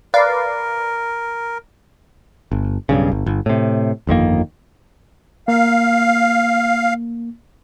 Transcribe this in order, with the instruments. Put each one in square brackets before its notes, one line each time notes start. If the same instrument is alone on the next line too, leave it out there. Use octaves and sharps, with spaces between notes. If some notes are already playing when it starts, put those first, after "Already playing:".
[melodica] A#4 [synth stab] B4 D5 F5
[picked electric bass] G1
B1 G2 C#3
G1
G1
A2 C3
G1 F2 D#3 A#3
[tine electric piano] A#3 [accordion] F5